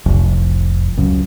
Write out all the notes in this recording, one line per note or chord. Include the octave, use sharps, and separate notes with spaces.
F1 C2 F2
C#2 F#2 C#3